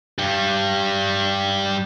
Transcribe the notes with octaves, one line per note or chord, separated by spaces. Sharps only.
G2 G3